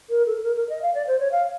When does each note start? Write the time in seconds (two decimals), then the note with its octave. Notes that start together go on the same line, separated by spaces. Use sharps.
0.10 A#4
0.27 A4
0.43 A#4
0.56 A#4
0.69 D#5
0.82 F5
0.94 D5
1.07 C5
1.20 C#5
1.32 F5